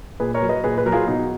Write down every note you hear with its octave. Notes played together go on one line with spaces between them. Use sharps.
A#2 G#4 B4
A#4 C#5
F#3
B4 D#5
A#2 G#4 B4
G#4 B4
F#3 A#4
F4 G#4
B2 D#4